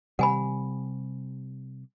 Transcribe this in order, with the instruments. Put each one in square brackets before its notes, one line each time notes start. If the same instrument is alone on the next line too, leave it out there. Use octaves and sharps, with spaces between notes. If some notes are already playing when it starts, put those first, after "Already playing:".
[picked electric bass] C3 G3 [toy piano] F#5 G#5 B5